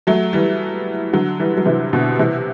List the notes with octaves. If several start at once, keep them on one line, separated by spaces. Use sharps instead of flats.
F#3 A3
E3 G3
D3 F#3
E3 G3
F#3
C3 E3
B2 D3
C3 E3